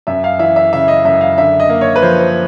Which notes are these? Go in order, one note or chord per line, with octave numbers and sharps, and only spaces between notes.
F#2 E5
F5
E3 E5
E5
C#3 E5
D#5
F#2 E5
F5
D3 E5
D#5
A#3
C#5
B4
F3 C5
C5